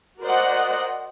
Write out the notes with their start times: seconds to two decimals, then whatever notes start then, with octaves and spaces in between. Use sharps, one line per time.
0.21 F#4 A#4 C5 D5 D#5 F#5